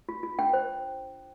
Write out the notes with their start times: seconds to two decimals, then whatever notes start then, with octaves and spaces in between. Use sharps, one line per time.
0.09 F4
0.23 F4
0.39 D4 G5
0.53 C5